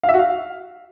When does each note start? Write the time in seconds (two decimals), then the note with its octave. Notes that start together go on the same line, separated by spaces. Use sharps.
0.03 F5
0.09 E5
0.14 F#4
0.19 F5